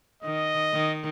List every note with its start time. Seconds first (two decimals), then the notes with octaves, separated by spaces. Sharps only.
0.23 D#3 D#5
0.73 D#3